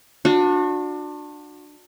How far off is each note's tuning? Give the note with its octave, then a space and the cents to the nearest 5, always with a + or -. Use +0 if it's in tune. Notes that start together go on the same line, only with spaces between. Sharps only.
D4 +20 F#4 -35